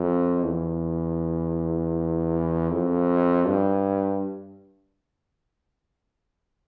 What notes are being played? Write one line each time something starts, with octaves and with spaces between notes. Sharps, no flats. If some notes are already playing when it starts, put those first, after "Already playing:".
Already playing: F2
E2
F2
G2